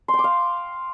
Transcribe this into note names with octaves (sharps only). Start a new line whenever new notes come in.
C6
G5
D6
F5